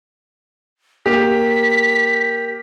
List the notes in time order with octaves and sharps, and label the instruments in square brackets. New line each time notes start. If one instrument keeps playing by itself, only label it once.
[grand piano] A#3 G4 [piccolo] B6